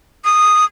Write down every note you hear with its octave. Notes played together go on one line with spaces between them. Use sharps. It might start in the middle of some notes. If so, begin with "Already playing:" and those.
D#6